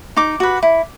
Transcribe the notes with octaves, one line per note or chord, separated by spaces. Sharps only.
D#4 D6
F#4 B4
E4